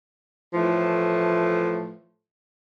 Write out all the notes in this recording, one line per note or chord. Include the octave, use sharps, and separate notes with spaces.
A2 E3 F3 A3